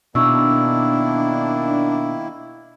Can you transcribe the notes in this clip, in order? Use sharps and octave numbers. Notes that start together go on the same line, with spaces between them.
B2 D#3 A#3 D4 E4 C#6 E6